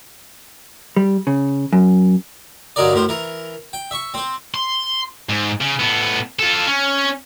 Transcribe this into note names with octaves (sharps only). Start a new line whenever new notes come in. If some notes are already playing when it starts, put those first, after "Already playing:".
G3
C#3
F#2
G2 D3 F#3 D#4 A#4 D5
F#2 A2 A#4 C5
E3 A#4
G5
E5 C#6
C4 C5
C6
G#2
C#3
A2 B3
F4 A4
C#4